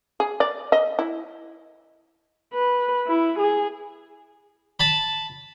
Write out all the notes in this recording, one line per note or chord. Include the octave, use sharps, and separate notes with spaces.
G#4
D5
D#5
E4
B4
E4
G#4
A5 B5